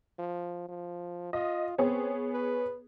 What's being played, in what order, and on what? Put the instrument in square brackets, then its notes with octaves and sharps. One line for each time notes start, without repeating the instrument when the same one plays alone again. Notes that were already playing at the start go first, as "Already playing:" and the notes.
[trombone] F3
F3
[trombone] F4 [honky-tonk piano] D#5
[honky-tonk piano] B3 G#4 C#5 [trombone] C4
[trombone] B4